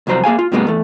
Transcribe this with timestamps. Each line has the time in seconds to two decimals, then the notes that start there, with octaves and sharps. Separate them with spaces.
0.07 C2 F2 F#3 C5 A#5
0.24 A#3 G#4 F5 G#5
0.39 F4
0.52 G#2 C3 F#3 G#3 A#3 B3
0.67 E2 A3